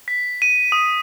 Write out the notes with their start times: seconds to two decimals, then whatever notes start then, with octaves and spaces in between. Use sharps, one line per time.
0.08 B6
0.42 D#7
0.72 D#6